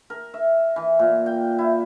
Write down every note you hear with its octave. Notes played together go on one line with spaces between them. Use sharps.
A#4
E5
E3
A#2
G5
E4